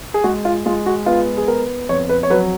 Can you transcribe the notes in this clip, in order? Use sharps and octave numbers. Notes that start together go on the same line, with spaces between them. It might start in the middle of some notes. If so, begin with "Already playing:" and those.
G#4
G#3 F#4
F4
G#3 F4
F#4
B3 F4
G#4
B3 A#4
F2 C#5
B4
C#5
F#3 B4